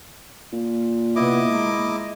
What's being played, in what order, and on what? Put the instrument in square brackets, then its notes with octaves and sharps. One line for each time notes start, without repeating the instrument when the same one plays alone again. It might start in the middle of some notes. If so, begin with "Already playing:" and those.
[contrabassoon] A#2
[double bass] C3 B3 [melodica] E4 D#5 D6
[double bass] G#3 A#3